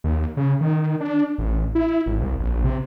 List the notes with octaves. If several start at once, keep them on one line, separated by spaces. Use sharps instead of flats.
D#2
C#3
D#3
D4
A1
E4
G#1
C2
A#1
C3